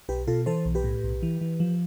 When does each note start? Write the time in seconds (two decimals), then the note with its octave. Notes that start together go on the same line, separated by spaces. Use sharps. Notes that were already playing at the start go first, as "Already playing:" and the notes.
0.09 B1 G4 B4
0.27 B2 F4 A4
0.46 E3 A4 C5
0.65 B1
0.75 G4 B4
0.84 A2
1.04 B1
1.23 E3
1.41 E3
1.60 F3